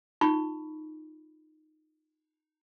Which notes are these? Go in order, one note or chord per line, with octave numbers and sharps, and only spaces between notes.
D#4 F4 B5 C#6